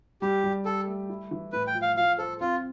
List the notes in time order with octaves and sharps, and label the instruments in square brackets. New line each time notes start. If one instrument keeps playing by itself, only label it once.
[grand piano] G3 [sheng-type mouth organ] G4
[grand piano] G3
[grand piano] G4 [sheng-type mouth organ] A4
[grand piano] A3
E4
E3
[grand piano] A2 [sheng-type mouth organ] B4
[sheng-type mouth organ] G5
[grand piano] F3
[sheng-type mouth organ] F5
[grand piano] F3 [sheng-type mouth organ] F5
[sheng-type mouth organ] A4 [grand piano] C5
[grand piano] C4 [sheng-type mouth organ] F4